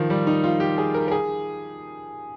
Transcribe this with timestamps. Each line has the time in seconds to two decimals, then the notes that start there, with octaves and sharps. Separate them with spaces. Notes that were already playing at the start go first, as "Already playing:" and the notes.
Already playing: D#3 F3
0.10 G3
0.27 D#4
0.44 F4
0.60 G4
0.78 G#4
0.94 A#4
1.08 A#4
1.12 G#4